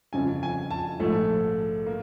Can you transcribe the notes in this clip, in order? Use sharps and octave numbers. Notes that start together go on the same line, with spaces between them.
G1 F2 C#3 F3 G#5
G#5
A5
A#1 G#2 F3 A3
A#3